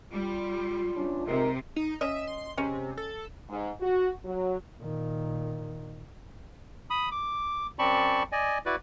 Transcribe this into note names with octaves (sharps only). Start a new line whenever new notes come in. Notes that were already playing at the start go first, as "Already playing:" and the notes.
G3 F4
E2 C#4 D4
C3 G#3 D#4 A#4
D#4
C#4 D#5 E5
C6
C3 G#3 C#4
A4
G#2
F#4
F#3
A#2 D#3
B5 D#6
D6
F#2 C4 D5 A5 B5 C#6
D5 D#5 G#5
E4 F#4 B4 D5